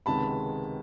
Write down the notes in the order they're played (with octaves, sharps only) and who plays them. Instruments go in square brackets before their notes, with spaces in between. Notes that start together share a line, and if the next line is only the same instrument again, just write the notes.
[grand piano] C#2 C3 D#3 G#3 B3 A5 B5